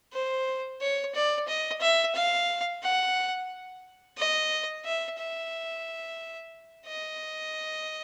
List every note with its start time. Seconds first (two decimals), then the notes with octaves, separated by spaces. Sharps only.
0.13 C5
0.81 C#5
1.14 D5
1.47 D#5
1.81 E5
2.15 F5
2.83 F#5
4.17 D#5
4.85 E5
5.19 E5
6.88 D#5